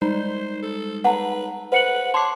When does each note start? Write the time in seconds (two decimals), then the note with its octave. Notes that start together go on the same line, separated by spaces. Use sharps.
0.02 G3 G#3 D#4 C5
0.63 A4
1.04 B4 F#5 A5 A#5
1.72 B4 C5 F#5 C#7 F#7
2.14 C#5 A5 C6 D6 C7